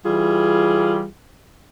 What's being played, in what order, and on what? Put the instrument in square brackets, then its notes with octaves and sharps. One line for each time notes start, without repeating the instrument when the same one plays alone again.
[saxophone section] E3 G3 F4 G#4